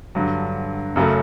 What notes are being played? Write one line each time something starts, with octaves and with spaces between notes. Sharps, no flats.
G2 D3 F#3
F#2 C#3 F#3 A3